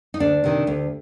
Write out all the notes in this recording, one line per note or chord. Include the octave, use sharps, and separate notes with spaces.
D#4
D2 D4
C3 D#3
D2